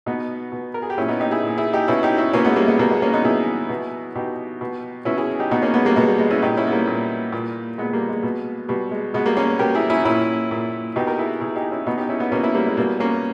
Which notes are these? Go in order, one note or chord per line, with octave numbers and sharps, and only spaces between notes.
B2 B3 D#4
B2
A#4
G#4
G4
A#2 C#4 E4
B3 D#4
D#4 G4
E4 G#4
A#2
E4 G#4
D#4 G4
B2 C#4 E4
D#4 G4
C#4 E4
B2 A#3 C#4
G#3 B3
G3 A#3
G#3 B3
B2 G3 A#3
G#3 B3
A#3 C#4
B3 D#4
B2 E4 G#4
B2
B2 D#4 G4
B2
B2 C#4 E4
E4 G#4
D#4 G4
B2 B3 D#4
A#3 C#4
G#3 B3
G3 A#3
B2 G#3
G3
G#3
C#4 E4
A#2 D#4 G4
C#4 E4
B3
G3 A#3
A#2
A#2
A#2 G#3 B3
G3 A#3
G#3
B2
B2 G3
G#3
B2 G#3 B3
G3 A#3
A#3 C#4
B2 G4 A#4
E4 G#4
C#4 E4
A#2 C#4 E4
A#2
B2 D#4 G4
G4 A#4
E4 G#4
B2 E4 G#4
D#4 G4
C#4 E4
B2 B3 D#4
D#4 G4
C#4 E4
B3 D#4
B2 A#3 C#4
C#4 E4
G3 A#3
G#3
B2 G3 A#3
A#3 C#4